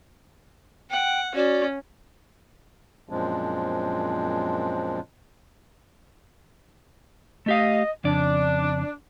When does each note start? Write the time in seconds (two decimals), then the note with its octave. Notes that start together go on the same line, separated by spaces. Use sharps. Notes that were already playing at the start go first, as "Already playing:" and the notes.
0.91 F#5 G5
1.35 C#4 F#4 D5
3.09 F#2 A#2 F3 G#3 C4 D4
7.46 A3 G4 D#5 F5
8.04 F2 C#3 D4 D5